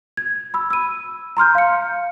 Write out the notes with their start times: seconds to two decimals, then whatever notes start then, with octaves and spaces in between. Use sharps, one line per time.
0.17 G#6
0.54 B5 E6
0.70 E6 D#7
1.37 A#5 C6 F6 G6
1.55 F5 C#7